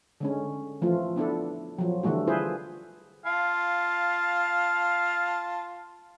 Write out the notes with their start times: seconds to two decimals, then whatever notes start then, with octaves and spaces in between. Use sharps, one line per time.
0.20 D3 G#3 C#4
0.82 E3 F3 A3 F4
1.16 B3 D4 E4 A4
1.78 F3 F#3
2.03 D3 E3 G3 A3 F#4
2.27 E4 F4 G#4 B4 C5
3.25 F4 F5 A5